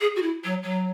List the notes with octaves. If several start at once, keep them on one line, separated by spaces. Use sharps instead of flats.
G#4
F#4
E4
F#3
F#3